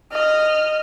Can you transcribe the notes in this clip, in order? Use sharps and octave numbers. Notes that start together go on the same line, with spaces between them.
D#5 F6